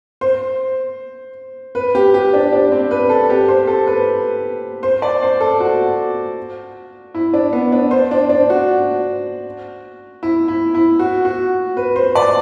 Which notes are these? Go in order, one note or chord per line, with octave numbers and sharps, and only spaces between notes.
C5
B4
G4
G4
D4
D4
C4
B4
A4
G4
C5
A4
B4
C5
D5
C5
A4
F#4
E4
D4
B3
D4
C5
D4
D4
F#4
E4
E4
E4
F#4
F#4
B4
C5
D5